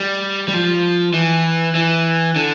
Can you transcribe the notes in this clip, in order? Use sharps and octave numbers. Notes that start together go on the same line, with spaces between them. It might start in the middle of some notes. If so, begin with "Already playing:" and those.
Already playing: G3
G3
F3
E3
E3
D3